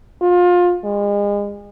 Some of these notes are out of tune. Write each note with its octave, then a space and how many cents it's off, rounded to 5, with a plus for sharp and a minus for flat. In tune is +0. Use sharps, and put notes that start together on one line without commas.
F4 +25
G#3 -35